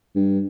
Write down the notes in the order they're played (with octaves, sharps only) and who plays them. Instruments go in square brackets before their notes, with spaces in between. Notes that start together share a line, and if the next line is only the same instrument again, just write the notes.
[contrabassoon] G2